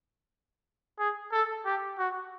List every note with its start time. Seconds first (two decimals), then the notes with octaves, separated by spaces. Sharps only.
0.99 G#4
1.32 A4
1.66 G4
1.99 F#4